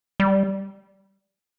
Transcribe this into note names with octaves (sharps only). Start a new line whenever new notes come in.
G3